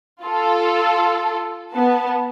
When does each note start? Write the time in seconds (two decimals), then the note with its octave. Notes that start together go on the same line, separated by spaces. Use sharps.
0.24 F4 A4
1.72 B3 A5